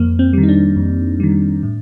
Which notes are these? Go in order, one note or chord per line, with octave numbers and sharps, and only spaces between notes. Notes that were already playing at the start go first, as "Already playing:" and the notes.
Already playing: F2 A#3
C4
D#3 G3
D#4
D4
F2
D#3 G3
A2